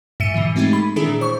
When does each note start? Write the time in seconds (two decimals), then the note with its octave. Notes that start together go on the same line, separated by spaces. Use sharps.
0.20 G#2 E5 C#7 D#7
0.34 G#2 B2 D3 E3
0.56 G#3 A3 C4 D#4 G4
0.73 B5
0.96 A#2 D#3 E3 D4 E4 G#4
1.21 C5 C#6